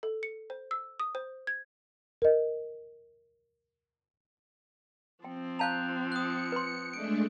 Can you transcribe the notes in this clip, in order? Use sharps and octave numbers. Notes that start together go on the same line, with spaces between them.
A4
C#7
C5
E6
D#6
C5
G#6
A#4 D#5
F3 C4 G5
F5 A5 A#5 F#6 G6 F7
D#6 F#6 C#7
B4 C6
G#3 A3 D4 D7